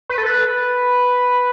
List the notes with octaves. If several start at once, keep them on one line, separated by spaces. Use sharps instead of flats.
B4
A4
B4